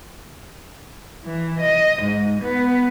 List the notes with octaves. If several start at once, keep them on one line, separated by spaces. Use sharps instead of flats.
E3
D#5
G#2
B3